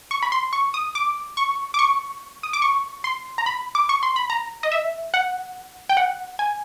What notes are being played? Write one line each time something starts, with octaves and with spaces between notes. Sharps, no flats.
C#6
B5
C6
C#6
D#6
D6
C#6
D6
C#6
D#6
D6
C#6
C6
A#5
B5
D6
C#6
C6
B5
A#5
D#5
E5
F#5
G5
F#5
G#5